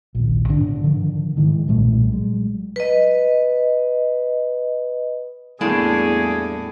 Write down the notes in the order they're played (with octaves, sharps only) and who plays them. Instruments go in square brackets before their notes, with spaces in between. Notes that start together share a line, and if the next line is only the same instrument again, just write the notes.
[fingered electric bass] A#1 D#2
G#2 D3 D4
D3 D#3 F3
G#2 D#3 E3
B1 A#2 G3 A3
F#3 G#3
[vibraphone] B4 D#5
[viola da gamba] E2 A3 F#4 [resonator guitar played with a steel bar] A2 [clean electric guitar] G3 A#3 D4 [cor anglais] G#4